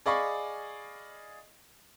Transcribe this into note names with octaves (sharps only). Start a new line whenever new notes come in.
G#4 D5 D#5 F5 B5 C#6